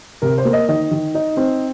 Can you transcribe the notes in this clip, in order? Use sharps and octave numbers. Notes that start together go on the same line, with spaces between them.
C3 A#4
C5
A#3
D#5
D#3 D#5
D#3
D#4
C4